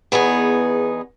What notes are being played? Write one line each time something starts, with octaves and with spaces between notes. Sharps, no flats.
E2 B3 D#4 G#4